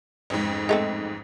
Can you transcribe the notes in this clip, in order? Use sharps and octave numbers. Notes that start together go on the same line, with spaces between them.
A1 F2 G#2
G#3 A3 C4